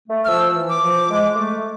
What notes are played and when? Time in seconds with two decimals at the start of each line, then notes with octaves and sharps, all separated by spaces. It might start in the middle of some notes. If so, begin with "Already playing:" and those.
0.09 A3
0.25 F6
0.28 F3 E6
0.55 E3
0.69 D6
0.82 F3
1.09 G#3
1.35 A3